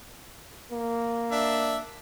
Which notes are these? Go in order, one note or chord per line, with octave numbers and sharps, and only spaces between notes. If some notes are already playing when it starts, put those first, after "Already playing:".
A#3
D4 E5